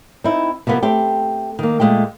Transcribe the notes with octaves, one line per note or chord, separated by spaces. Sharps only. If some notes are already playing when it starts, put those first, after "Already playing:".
C4 D#4 E4
C3 F3 A#3 B3
A3 C4 G4
D#3 A#3
A#2 E3 G#3 A3 G5